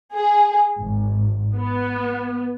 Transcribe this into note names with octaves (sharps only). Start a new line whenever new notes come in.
G#4
G#1
B3